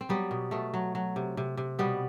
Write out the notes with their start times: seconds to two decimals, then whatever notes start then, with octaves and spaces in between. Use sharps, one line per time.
0.01 C4
0.09 F#3 G3 B3
0.31 B2
0.51 B2 A3
0.74 F#3
0.95 F#3
1.16 C3
1.37 C3
1.57 C3
1.79 B2 G3 B3